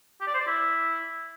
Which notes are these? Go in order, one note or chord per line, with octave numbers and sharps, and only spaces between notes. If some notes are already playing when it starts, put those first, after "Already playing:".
G4
D5
C5
D5
E4